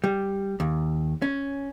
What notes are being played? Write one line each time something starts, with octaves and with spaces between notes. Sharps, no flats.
G3
D#2
C#4